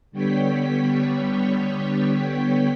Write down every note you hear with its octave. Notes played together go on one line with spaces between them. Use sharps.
D3 G3 B3 C#5 G5 B6